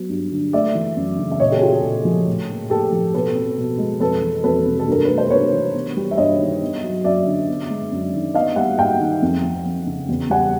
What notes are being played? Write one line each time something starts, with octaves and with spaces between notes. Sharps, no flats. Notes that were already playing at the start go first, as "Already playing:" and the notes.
Already playing: F#3 B3
G2
D3
A3 D5 E5
E3
F#2
C#3
E5
A#2 C#5 D#5
G4 A4
G#4
A#3 F4 G4
G4 A4
A#2
F3
A2
A#3
A2 G4 A4
F3
B2 A4 B4
C4
B2
G#3
F2 A4 B4
E3
F2 A4 B4
C3
A4
G2 A#4
A3 B4
C5
G2 B4 C#5
E3
B3
G3
E5
G2 C#5 D#5
D#3
B3
F#3
F#2 D5 E5
D3
B3
G#3
F#2
D#3
B3 D#5 F5
G3 E5 F#5
G#2 F5 G5
D#3
F2
F3
F2
C#3
E2
G3 F#5 G#5